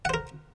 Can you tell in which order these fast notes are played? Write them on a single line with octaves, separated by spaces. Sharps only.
F#5 C5 A#4